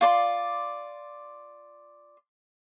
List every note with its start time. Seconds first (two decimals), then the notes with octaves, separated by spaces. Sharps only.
0.01 F4 D5 C6